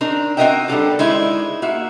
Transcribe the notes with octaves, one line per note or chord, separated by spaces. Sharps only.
C4 D4 D#4 A#4
C4 F#4 A#4 D#5 E5 G5
G3 B3 D4 A4 A#4 D5
G#3 D#4 E4 C5 D5
A#3 F#4 E5